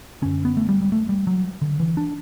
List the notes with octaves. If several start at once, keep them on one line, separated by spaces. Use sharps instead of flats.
F#2 D3 C#4
B3
A3
G3
G3
A3
G3
F#3
D3
E3
D4